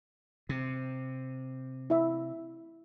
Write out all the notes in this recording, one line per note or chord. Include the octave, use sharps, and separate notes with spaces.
C3
E4 E5